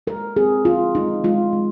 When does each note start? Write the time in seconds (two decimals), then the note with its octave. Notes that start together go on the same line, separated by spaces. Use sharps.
0.07 G#3 A#4
0.36 C4 G#4
0.65 D3 F4
0.95 G#3 D#4
1.24 G#3 F4
1.53 G#3